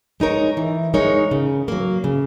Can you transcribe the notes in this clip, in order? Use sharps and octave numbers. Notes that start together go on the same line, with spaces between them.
G#3 D#4 A#4 C#5
E3
G#3 D#4 A#4 C#5
C#3
F#3 A#3
C#3